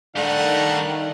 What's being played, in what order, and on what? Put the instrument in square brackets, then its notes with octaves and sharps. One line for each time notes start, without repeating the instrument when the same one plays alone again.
[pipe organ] D#3 [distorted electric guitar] G3 D#4 [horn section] A3 F5 F#5 [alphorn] D4